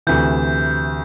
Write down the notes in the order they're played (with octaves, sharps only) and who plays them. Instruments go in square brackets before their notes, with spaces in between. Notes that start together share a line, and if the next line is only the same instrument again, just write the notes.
[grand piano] D2 C3 E3 [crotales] G6